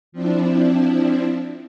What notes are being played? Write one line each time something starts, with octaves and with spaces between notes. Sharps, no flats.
F3 C4 D4 E4